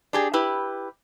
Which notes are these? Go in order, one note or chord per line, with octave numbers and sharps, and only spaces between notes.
D4 G4 G#4
E4 G4 B4